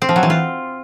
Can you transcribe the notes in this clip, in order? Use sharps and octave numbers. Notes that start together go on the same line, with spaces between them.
C4
F3
F#3
E3
F4